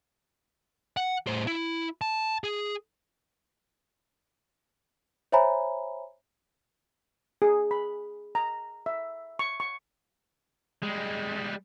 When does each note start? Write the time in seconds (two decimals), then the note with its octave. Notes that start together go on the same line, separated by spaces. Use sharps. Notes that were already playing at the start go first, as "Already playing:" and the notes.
0.97 F#5
1.27 A2 C5
1.47 E4
2.01 A5
2.44 G#4
5.32 C5 C#5 E5 G#5 A#5 B5
7.42 G#4
7.71 B5
8.35 A#5
8.86 E5
9.39 C#6
9.60 C#6
10.82 G3 G#3